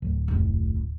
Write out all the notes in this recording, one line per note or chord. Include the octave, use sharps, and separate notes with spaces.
D1
F1 C2